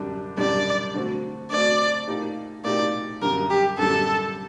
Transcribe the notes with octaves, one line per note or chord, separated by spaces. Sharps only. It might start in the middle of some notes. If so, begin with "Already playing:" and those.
Already playing: F#2 D3 G3 D4
F#2 D3 G3 D4 D5
D3 A3 C4 F#4
D3 A3 C4 F#4 D5
A#2 A3 D#4 G4
A#2 A3 D#4 G4 D5
F#2 D3 G3 A#4
G4
F#2 D3 G3 A4